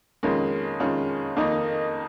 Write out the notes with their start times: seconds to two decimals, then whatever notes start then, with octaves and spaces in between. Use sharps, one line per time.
0.23 F2 D#3 G#3 C#4 F4
0.79 F2 D#3 G#3 C#4 F4
1.36 F2 D#3 A#3 D#4